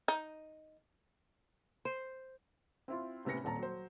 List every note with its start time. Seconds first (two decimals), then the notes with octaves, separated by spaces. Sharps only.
0.08 D#4
1.85 C5
2.88 C4 E4 F4
3.25 A2 C3 B3 C#4 A#6 C#7
3.44 D#1 A#2 C4 A5 A#5
3.59 F#3 C5